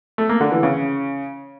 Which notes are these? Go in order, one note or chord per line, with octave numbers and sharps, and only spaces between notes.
A3
A#3
D3
E3
C#3